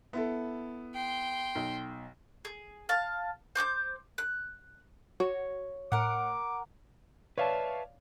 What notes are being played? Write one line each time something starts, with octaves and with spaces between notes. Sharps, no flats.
B3 E4 A4
G5 C6
B1
G#4
F5 A5
C5 D6 F#6 G6
F#6
F#4 C#5
A2 A#4 F#5 D6
B4 C#5 D5 E5 F5 A5